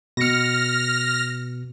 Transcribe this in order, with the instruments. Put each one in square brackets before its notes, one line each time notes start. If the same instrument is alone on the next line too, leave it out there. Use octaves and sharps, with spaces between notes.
[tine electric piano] B2 C#7 [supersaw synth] F6 A#6